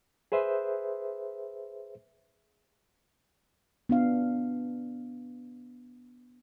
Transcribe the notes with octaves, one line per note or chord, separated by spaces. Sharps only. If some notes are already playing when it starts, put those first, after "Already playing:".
G#4 B4 C5 E5
B3 D4 F5